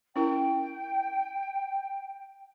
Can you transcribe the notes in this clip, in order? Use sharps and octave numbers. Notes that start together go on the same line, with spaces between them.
C#4 E4 A#4 G5